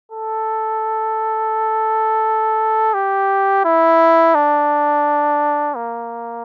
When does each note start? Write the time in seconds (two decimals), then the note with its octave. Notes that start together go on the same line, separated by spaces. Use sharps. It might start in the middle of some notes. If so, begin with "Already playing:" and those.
0.12 A4
2.94 G4
3.65 E4
4.35 D4
5.76 A#3